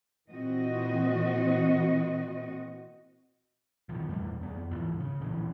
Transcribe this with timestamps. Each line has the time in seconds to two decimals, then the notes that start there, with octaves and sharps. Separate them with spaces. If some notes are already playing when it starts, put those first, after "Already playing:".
0.30 A#2 E3 C4 F#4 D#5
3.89 F2 D#3 F3
4.08 D#1 E2 G3 A3
4.41 F2 B3
4.71 D1 G#2 E3 F3
5.00 C#3
5.21 D1 A#1 E3 C#4